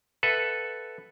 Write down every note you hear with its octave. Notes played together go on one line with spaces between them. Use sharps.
A4 B4 E5 F#5